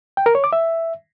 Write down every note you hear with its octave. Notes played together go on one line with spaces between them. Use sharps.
G5
A#4
C#5
D6
E5